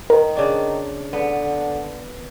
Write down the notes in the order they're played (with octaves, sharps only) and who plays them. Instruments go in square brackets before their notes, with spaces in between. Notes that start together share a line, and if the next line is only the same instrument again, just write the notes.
[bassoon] D#3 [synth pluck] A#4
[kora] C#3 D4
[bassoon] D3 [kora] B3